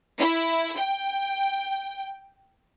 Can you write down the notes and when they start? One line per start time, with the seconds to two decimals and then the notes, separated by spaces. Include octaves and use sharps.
0.18 E4
0.78 G5